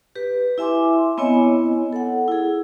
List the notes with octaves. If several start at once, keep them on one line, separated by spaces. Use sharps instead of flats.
G4 B4
E4 E5 G#5 C6 D6
B3 C4 E4 C#5 D#5 G#5
A4 F#5
E4 G#4